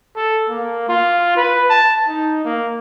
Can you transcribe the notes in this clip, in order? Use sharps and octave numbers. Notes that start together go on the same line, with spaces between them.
A4
A#3
F4
B4
A5
D#4
A#3